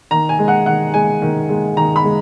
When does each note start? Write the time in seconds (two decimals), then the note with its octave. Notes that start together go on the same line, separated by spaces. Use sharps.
0.11 D#3 A#5
0.29 G#5
0.39 G#3
0.48 F#5
0.66 D#3 F#5
0.94 G#3 G#5
1.22 D#3
1.49 G#3
1.77 D#3 A#5
1.96 B5
2.05 G#3